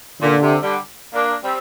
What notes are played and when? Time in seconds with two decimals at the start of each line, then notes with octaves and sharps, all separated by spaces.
0.21 A#2 D3
0.42 C3
0.62 D3 G3
1.13 A#3 D4
1.43 G3 C4